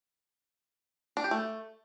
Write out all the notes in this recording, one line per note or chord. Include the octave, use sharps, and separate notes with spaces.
D4
G4
A3